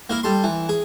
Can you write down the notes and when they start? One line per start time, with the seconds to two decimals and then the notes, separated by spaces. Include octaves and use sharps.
0.10 A#3 E4 A#4
0.23 G3 A4 C6
0.44 E3
0.69 G#4